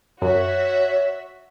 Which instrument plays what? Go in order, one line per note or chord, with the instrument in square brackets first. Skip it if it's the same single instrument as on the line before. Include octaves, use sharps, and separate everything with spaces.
[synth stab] F#2 [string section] F#4 E5 [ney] C#5